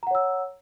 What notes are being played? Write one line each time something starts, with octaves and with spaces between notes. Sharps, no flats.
C#5 F#5 A#5 E6